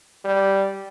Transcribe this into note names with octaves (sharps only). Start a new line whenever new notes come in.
G3